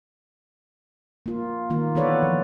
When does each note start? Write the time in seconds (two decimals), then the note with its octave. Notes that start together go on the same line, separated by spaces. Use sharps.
1.26 A#3 F4
1.70 D#3 A#3 F4
1.95 E3 B3 A4 B4 C#5 D5
2.23 F3